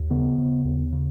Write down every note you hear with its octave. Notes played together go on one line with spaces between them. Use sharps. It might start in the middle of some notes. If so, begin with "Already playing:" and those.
Already playing: D#2
C#3 B3
C#3
D#2
C#3